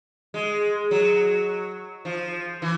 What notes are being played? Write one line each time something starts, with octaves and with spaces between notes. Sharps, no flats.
G#3
F#3
F3
E3